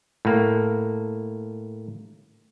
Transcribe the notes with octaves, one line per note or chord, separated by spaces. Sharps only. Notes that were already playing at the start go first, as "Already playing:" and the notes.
A2 A#3